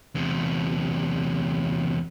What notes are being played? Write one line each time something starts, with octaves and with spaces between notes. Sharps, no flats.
E2 C3